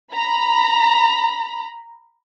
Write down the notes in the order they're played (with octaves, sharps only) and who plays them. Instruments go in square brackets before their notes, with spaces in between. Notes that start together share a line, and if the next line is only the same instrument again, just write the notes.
[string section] A#5 B5